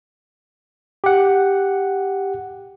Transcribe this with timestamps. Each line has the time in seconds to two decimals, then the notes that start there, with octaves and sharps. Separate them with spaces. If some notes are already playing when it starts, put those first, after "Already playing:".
1.04 G4 F#5